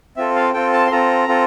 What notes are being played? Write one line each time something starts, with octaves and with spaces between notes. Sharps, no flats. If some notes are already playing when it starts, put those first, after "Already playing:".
C4 F4 A4 E5
F5
C4 F4 A4 G5
A5
C6
C4 F4 A4 A#5
C4 F4 A4